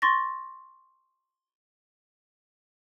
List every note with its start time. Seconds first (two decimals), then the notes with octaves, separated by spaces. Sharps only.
0.02 C6 C#6 A6 A#6